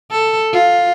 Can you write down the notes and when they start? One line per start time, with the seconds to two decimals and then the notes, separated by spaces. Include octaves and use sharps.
0.11 A4
0.52 F4